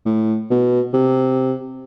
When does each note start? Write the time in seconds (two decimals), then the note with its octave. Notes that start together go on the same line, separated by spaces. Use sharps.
0.05 A2
0.50 B2
0.93 C3